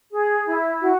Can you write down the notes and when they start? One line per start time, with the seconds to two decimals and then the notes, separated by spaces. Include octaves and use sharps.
0.11 G#4
0.46 E4
0.81 F#4